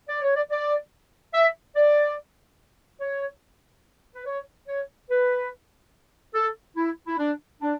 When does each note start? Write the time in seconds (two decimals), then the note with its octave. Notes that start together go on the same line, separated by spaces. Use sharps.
0.08 D5
0.22 C#5
0.36 D5
0.50 D5
1.34 E5
1.76 D5
3.01 C#5
4.14 B4
4.26 C#5
4.68 C#5
5.10 B4
6.35 A4
6.77 E4
7.07 E4
7.18 D4
7.61 D4